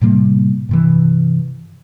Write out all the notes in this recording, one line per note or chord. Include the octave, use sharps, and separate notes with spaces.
A2 C3 G3 A#3
G2 C3 E3